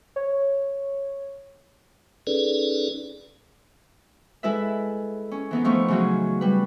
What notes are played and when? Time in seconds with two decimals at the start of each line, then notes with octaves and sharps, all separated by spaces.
0.16 C#5
2.27 C#4 D#4 G#4 A4 B4 D5
4.43 G#3 E4 A4 B4 E5
5.31 C#4
5.51 E3 B3 D#4
5.64 F3 A3 B3 D#4 C#6
5.88 C#3 E3 F#3 C#4 D#4
6.41 G3 B4